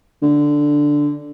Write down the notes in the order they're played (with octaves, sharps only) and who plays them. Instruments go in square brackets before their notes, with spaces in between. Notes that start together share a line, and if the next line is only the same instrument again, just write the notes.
[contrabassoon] D3